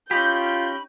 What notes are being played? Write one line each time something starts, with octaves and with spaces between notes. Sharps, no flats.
C#4 D#4 F4 G4 B5 G6